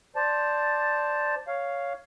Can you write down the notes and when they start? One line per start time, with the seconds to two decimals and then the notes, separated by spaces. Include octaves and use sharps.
0.16 C5 D5 A5
1.48 C#5 F5